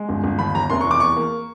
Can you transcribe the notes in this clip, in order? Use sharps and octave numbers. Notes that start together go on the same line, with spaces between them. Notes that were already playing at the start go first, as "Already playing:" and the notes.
Already playing: G#3
G1
G1
D#2 B5
D#2 A#5
F1 C6
E3 C#6
D6
E2 C#6
A#3